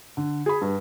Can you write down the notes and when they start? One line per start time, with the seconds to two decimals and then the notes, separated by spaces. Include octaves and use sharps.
0.17 D3
0.46 G#4 B5
0.61 G2